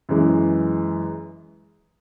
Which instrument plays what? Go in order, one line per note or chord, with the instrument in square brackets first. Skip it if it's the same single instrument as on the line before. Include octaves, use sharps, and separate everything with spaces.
[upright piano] F#2 E3 G#3